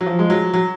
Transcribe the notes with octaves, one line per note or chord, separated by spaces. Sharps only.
F#3
F3
G#3
F#3
F#3